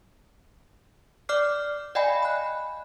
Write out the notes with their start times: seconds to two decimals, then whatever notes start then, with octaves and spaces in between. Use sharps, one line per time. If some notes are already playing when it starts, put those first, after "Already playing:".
1.29 D5 D6 F6 C7
1.95 D5 D#5 F5 G5 G#5 B5
2.23 B5 F#6